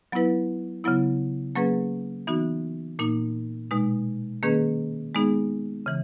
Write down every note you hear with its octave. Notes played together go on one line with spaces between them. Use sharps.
F#3 B3 E4 B4
C#3 F#3 B3 E4
F#3 A#3 C#4 G#4 B4
E3 B3 D#4 F#4
A#2 A#3 D#4
B2 G#3 D#4
D#3 A#3 C#4 G#4 B4
G#3 B3 D#4 G#4
C#3 E3